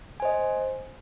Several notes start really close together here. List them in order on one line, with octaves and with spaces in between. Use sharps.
G#5 C5 D#5